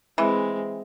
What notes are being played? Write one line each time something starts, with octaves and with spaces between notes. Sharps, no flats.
E3 G#3 C4